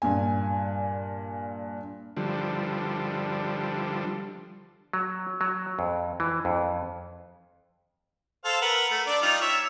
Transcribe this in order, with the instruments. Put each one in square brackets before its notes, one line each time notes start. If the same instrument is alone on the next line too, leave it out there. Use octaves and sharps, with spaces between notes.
[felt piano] G2 A#2 G#5
[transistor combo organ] D3 F3 G3
[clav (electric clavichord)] F#3
F#3
F2
E3
F2
[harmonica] A4 C5 F5
A#4 B4 F#5
A3
D4 D5
G3 D#4 F4
C#5 E5